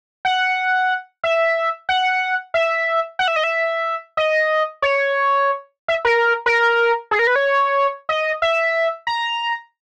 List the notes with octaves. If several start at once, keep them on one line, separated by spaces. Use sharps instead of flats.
F#5
E5
F#5
E5
F#5
E5
D#5
E5
D#5
C#5
E5
A#4
A#4
G#4
A#4
B4
C#5
D#5
E5
A#5